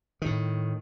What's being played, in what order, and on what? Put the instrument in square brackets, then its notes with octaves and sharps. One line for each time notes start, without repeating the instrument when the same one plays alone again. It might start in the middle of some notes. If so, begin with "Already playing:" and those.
[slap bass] A2 D#3